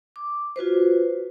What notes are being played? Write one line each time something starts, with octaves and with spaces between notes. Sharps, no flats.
D6
F4 F#4 B4 C5